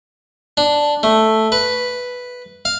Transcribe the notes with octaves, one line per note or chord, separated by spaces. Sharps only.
D4
A3
B4
F5